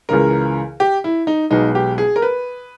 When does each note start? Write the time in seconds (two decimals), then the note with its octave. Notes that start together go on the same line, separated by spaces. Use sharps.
0.09 C#2 C#3 E3 A#4
0.80 G4
1.04 E4
1.27 D#4
1.50 B1 B2 G#3 D#4
1.75 G4
1.98 G#4
2.16 A#4
2.22 B4